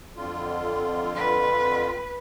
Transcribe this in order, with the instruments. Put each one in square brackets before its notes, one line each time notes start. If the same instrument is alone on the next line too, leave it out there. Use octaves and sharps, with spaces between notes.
[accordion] F2 D3 F4
[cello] B4